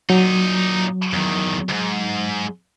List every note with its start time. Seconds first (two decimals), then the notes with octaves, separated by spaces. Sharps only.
0.10 A#2 F#3 D#4
1.13 E2 D#3
1.69 D2 G#2